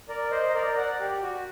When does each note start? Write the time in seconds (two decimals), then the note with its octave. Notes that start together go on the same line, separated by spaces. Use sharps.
0.09 A#4 D5
0.31 C5 D#5
0.49 D#5
0.54 A#4 D5
0.77 D5 F#5
1.00 G4
1.23 F#4